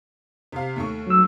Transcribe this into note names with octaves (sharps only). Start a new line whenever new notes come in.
C3 F5
D#2 A3 C#6
F#3 E6